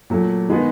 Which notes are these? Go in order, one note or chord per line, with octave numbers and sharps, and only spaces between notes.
A#2 F#3 A3
D#3 G#3 B3 D#4